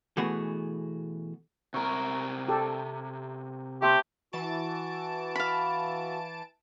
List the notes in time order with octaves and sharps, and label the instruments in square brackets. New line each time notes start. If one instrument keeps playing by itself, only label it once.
[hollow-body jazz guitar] B2 E3 A3 B3 F#4 G#4
[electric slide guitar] C3 A#4 [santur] A#5 C#6
[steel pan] G4 A4
[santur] A3 C4 [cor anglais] G4
[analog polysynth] E3 A5 D7 [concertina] F#4
[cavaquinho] F5 B5